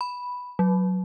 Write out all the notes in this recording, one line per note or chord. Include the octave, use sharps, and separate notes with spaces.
B5
F#3